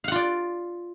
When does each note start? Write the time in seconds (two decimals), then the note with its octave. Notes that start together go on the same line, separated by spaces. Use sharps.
0.04 F5
0.08 F#5
0.12 F4
0.16 D5